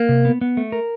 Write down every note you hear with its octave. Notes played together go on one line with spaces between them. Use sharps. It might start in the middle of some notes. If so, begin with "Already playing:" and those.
Already playing: A#3
C3
B3
B3
A3
A#4